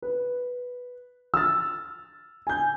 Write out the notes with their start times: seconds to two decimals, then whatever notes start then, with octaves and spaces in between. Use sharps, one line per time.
0.02 B4
1.34 E6 F6 A6
2.47 G#5 G6